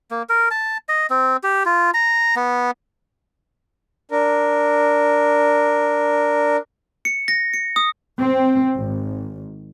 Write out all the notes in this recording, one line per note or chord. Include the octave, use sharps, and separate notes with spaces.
A#3
A#4
A5
D#5
C4
G4
F4
A#5
B3
D4 A#4
C#7
A#6
C#7
D#6
C4
G#1